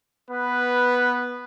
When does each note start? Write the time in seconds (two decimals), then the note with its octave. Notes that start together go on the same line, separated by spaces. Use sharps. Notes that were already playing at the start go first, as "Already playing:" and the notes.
0.30 B3 B4